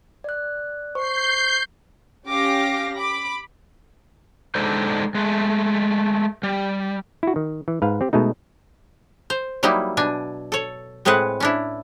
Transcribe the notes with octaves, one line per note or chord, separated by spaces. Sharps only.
D5 F#6
C5 C#6 G6 C7
C#4 G4 F5 D6 A#6
B5 D6
G#3 D4 D#4 A4 C5 D5
G#3 A3
G3
E4 F#4
D#3
E3
G#2 B4 F5
C4 G4
B2 G#3 A3 D#4
C5
F#3 G3 A#3 D#4 E4
B2 D4 G#5
A4 C#5
A2 G#3 C4 G#4 B4 F#5
C#4 D4 E4